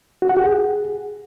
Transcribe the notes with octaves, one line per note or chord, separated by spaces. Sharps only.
F#4
F#5
G4
G#4